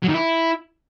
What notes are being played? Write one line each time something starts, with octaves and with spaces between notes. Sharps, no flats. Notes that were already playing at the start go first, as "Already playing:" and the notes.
F#3
D#3
E4